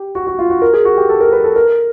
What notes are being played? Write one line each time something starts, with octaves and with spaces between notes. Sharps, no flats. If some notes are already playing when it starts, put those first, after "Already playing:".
Already playing: G4
F#4
F#4
F4
F#4
A#4
G#4
F#4
G4
A4
A#4
B4
A4
A#4